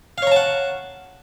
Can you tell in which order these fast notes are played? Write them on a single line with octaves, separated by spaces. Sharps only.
F5 C#5 A#5 A5 F#5